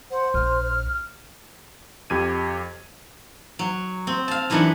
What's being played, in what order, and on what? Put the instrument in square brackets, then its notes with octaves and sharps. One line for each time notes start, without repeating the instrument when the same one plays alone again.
[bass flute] C5 [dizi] F#5
[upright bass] A#1 [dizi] F6
[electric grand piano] F2 G4 G#6 D#7
[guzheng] F#3
C4
F5 A5
F#2 E3 D4 D#4 B4 F#5